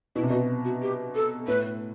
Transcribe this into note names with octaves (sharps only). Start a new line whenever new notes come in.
B2 E4
C3
B2 F#4
F#4
G4
A4
A2 B4